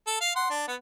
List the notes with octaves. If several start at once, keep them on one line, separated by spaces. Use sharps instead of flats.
A4
F5
F#5 C6
D4
B3 F#5